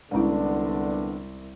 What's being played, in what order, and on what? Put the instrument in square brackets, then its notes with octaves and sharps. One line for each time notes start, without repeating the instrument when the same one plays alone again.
[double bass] C2 [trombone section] D3 B3 D4 [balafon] G#3 C#4 E4